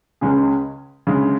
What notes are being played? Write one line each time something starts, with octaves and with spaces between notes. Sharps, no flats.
C#2 C#3 G#3 C#4 G#4
D2 C#3 G#3